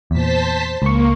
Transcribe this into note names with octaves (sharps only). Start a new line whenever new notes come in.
E2 A#2 C5 A5 B6
C#2 A#3 C#6